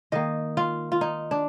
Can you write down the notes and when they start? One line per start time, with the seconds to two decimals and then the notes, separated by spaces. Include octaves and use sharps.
0.12 D#3 A#3 D#5
0.57 F4
0.92 F4
1.01 D#4
1.31 D4